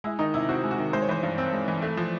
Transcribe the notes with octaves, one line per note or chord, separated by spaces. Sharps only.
G#3 E4
D#3 D#4
C3 E4
C4 F#4
G#3
F#4
D#3
G#3 C5
C#5
E3 C5
G2
C4
G#3
E3
A3
F3